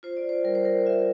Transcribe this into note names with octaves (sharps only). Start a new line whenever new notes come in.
F4 C5
D5
C5
G3 A#4
C5
A#4
F4 E5